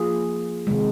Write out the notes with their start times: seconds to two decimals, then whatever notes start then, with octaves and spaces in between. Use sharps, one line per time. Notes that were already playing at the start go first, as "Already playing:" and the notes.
Already playing: F3 A#3 F4 G#4
0.67 C3 D#3 G#3